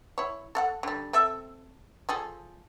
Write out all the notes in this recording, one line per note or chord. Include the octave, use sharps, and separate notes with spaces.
E4 C#5
A4 F5 F#5
D3 G3
C4 A4 E5
F3 G#4 A4